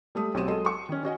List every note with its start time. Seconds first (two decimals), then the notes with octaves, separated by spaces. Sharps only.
0.15 G3 A3 D#6
0.34 B1 C4 F#4 G4 D#7 E7
0.48 F#3 G#3 A4 D#5 C6
0.65 C6 C#6
0.89 D#3 C#4
1.03 C#4 F#4 D#5 G#5